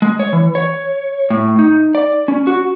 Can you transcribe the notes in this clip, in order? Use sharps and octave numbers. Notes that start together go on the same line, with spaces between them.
G#3
C#5
E3
C#5
A2
D#4
D5
C#4
F#4